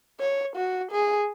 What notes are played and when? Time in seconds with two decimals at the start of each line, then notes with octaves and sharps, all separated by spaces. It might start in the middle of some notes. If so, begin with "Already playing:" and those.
0.20 C#5
0.56 F#4
0.91 G#4